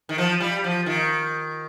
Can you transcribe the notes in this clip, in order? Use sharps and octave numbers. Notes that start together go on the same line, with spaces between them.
D#3
F3
G3
F3
D#3